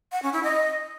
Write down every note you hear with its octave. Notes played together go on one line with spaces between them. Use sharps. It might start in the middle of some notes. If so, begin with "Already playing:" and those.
F#5
C#4
E4
D#5